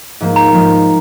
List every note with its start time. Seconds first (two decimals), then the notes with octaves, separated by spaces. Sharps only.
0.21 G#2 F3 A#3
0.36 A#5
0.52 G#2 F3 A#3